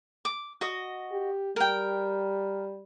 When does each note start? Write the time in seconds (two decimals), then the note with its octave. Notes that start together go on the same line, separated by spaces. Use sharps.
0.25 D6
0.61 F#4 D#5
1.11 G4
1.56 G3 A#4 G5